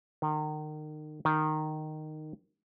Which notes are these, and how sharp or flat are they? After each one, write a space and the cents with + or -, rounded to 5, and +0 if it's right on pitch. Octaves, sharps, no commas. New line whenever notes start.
D#3 -30
D#3 -10